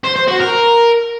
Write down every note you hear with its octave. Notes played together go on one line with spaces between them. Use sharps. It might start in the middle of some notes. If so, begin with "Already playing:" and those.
C5
C5
F#4
A#4